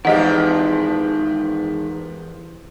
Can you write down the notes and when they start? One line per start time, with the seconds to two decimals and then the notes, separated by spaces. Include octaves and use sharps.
0.05 E2 D#3 F3 G#3 G4 D#5 F#5